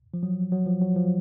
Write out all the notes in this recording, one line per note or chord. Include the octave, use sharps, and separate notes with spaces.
F3
F#3
F#3
F3
F#3
F3